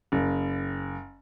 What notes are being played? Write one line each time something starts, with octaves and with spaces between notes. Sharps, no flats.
F#1